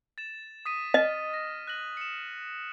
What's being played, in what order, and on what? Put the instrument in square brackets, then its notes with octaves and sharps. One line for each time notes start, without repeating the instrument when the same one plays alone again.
[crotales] A6 E7
D#6 B6 D#7
[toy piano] D#5 [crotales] F6
[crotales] A#6
F#6 A#6 F#7
C#7 E7